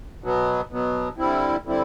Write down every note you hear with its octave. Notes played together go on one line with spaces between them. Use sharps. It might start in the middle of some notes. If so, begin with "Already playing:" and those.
B2 F#3 B3
B2 F#3 B3
D3 G3 C4 E4
D3 G3 C4 E4